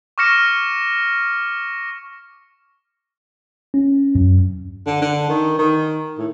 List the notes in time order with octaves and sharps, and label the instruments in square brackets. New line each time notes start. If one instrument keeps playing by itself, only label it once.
[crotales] C#6 D6 F6 A#6 C#7 E7
[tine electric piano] C#4
F#2
[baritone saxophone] D3
D3
D#3
D#3
A2